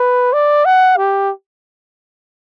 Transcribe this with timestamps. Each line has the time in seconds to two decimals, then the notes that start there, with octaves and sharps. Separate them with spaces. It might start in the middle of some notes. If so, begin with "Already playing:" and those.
Already playing: B4
0.33 D5
0.65 F#5
0.97 G4